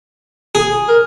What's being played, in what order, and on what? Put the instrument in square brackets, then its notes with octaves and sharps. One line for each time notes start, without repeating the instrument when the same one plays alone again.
[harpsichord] G#4
[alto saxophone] A#4